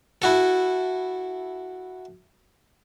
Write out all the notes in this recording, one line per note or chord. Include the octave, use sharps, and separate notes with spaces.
E4 F#4 A4